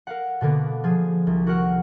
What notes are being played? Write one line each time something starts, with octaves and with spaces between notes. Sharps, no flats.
A#4 F5 F#5
B2 D3 A#3 B3
F3 G#4
C2
F#4 A#4 F#5 F6